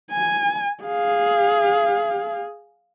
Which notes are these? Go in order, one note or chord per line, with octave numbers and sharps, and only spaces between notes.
G#5
G#4 F5